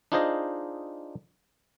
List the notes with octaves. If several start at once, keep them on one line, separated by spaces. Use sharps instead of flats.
D4 D#4 F4 G#4 C5 D#5